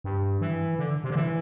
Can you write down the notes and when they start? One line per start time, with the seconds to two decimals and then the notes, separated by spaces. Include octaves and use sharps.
0.04 G2
0.41 E3
0.79 D3
1.04 C3
1.10 D3
1.16 E3